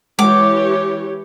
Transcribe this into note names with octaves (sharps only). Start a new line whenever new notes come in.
E3 G#3 G4 C#5 D6